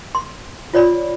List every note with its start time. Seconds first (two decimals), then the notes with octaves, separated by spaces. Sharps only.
0.15 C6
0.73 F4 C#5 D5 B5